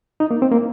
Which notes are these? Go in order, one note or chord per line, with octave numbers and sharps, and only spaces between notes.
D#4
A#3
C4
A#3